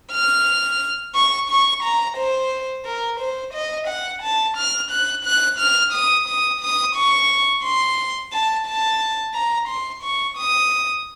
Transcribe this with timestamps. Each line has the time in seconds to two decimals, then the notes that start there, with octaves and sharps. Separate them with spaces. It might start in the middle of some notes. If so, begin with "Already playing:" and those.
0.12 F6
1.15 C#6
1.50 C#6
1.83 A#5
2.17 C5
2.85 A#4
3.20 C5
3.54 D#5
3.88 F#5
4.22 A5
4.57 F6
4.91 F#6
5.25 F#6
5.59 F6
5.93 D#6
6.28 D#6
6.61 D#6
6.96 C#6
7.64 C6
8.33 A5
8.67 A5
9.34 A#5
9.68 C6
10.03 C#6
10.37 D#6